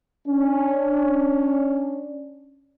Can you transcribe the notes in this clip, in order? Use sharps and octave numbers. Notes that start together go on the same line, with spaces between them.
C#4 D4